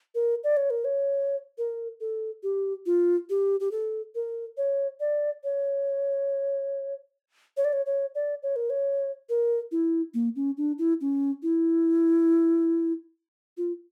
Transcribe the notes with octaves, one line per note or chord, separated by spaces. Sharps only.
A#4
D5
C#5
A#4
C#5
A#4
A4
G4
F4
G4
G4
A4
A#4
C#5
D5
C#5
C#5
D5
C#5
C#5
D5
C#5
A#4
C#5
A#4
E4
A#3
C#4
D4
E4
C#4
E4
F4